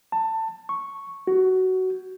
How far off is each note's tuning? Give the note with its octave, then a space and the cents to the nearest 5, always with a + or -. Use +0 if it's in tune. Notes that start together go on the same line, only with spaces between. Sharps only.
A5 +20
C#6 -5
F#4 +15